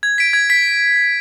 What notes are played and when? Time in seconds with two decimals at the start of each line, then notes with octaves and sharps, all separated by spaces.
0.03 G#6
0.18 B6 D7
0.33 G#6
0.50 B6